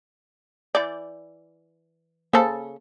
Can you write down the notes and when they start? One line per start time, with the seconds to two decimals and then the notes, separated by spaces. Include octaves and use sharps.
0.75 E3 D5 G6 A6
2.33 C#3 A#3 A4 C5 F5